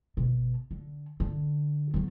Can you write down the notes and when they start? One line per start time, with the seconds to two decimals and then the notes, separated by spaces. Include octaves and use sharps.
0.17 G1 B2
0.71 D3
1.20 D3
1.94 F#3 B3